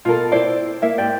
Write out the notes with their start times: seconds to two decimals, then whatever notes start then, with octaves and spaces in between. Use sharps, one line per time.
0.05 B2 F4 A4 A#4
0.32 C4 E4 C5 D5
0.82 A#3 E4 E5
0.98 G#2 G4 D5 G5